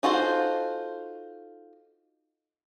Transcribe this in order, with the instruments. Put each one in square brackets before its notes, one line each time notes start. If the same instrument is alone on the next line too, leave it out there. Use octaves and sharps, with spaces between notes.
[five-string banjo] D#4 F4 F#4 A4 C5